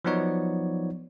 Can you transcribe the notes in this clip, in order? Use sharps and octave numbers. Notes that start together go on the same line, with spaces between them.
F3 F#3 B3 D#4 C#5 D5